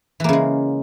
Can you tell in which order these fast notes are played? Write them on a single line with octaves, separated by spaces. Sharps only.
E3 A#3 C#3 G#3